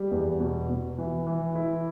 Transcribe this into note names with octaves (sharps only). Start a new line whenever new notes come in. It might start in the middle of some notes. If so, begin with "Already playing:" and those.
Already playing: G3
E2
B2
B2
E3
E3
E4